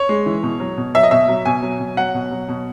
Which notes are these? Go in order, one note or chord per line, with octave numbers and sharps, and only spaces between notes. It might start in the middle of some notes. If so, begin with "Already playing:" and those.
Already playing: C#5
G#3
E3
B2
F#3
B2
F#3 E5
D#5
B2 E5
F#3
B2 G#5
F#3
B2
F#3 F#5
B2
F#3
B2